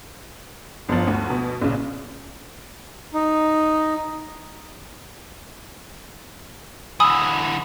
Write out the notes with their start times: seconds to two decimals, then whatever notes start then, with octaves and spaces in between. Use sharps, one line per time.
0.89 G1 F3
1.07 D2
1.30 B2
1.61 A#1 C#3
3.14 D#4
7.00 D3 E3 G#5 D#6 E6